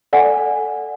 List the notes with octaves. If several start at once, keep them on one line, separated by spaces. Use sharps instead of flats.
A4 D5 F#5 G#5